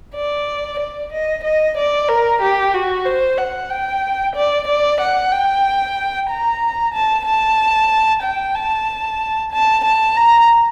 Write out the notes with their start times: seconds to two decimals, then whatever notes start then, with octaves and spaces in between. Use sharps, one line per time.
0.16 D5
0.79 D5
1.12 D#5
1.44 D#5
1.77 D5
2.09 A#4
2.42 G4
2.74 F#4
3.05 C5
3.38 F#5
3.70 G5
4.36 D5
4.68 D5
5.00 F#5
5.32 G5
6.30 A#5
6.94 A5
7.26 A5
8.23 G5
8.55 A5
9.52 A5
9.85 A5
10.16 A#5